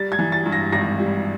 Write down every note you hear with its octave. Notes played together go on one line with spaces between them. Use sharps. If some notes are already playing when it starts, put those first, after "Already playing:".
Already playing: G3 A6
G#6
E3
A6
G2
A#6
G#1 A#6
G3